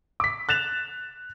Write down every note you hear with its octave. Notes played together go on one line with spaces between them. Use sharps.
D6 B6
F#6 A6 E7 F7